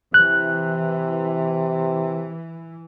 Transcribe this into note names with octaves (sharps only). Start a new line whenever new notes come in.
C3 E3 F#6